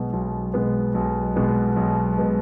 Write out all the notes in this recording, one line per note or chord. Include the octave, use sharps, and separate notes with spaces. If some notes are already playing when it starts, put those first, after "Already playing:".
Already playing: B1 B2 G#3 B3
B1
B2 G#3 B3
B1
B2 G#3 B3
B1
B2 G#3 B3